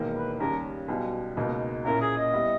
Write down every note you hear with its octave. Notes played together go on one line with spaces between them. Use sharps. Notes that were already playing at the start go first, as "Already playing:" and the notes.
Already playing: E1 E2 D#3 A#3
B4
D#2 C#3 G3 C#4 A#4
B1 B2 G3
C#2 B2 A#3 D#4
A#2 A#3 C#4 E4 A#4
G#4
D#5
G3 B3 E4